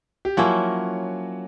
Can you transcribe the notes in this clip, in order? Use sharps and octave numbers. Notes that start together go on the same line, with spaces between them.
G4
F3 F#3 A#3 C#4 E4 F#4